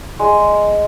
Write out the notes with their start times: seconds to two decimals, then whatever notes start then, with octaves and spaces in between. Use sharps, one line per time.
0.19 G#3